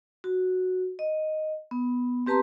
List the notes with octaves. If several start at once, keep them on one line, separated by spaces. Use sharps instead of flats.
F#4
D#5
B3
C4 G4 B4 A5 A#5 C6